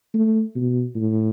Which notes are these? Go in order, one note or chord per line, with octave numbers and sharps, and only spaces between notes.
A3
B2
A2